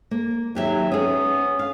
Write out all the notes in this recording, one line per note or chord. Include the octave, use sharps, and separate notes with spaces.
A#3
D#2 F#3 G4 E5
B3 C#4 G#4 D#6
F5